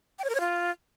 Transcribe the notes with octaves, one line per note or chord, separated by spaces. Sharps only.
G5
C#5
A#4
C#5
F4